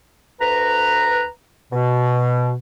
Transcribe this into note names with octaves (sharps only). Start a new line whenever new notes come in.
D2 B4 A#5
B2